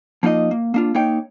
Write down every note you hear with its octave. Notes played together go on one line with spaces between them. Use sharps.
F3 A#3 D#4 F4 D#5
A#3
A#3 D4 F4
A#3 D#4 C#5 G5